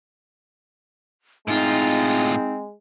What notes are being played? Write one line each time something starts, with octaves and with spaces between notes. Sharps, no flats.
A2 G#3 C4 D#4 F4